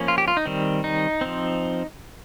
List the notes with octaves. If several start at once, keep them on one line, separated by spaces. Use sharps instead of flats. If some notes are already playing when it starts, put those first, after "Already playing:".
Already playing: F3 A#3 C#4
F4
G4
F4
D#4
D#3 G3 C4
D#4
F3 C4